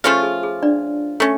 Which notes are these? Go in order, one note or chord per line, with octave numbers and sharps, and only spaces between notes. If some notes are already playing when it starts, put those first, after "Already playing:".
F3 A3 C#4 F4 G#4
G#4
G#4
D4 D5
A3 C#4